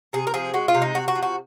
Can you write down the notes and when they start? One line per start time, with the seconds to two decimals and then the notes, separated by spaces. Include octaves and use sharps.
0.13 C3 G#4
0.27 A#4
0.34 F3 G#4
0.54 G#3 F#4
0.68 F4
0.75 C3
0.82 D#4
0.94 C3 F#4
1.08 F#4
1.15 F3
1.23 F#4